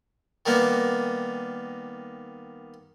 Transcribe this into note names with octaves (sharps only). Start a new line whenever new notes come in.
D#3 G3 A#3 B3 D#4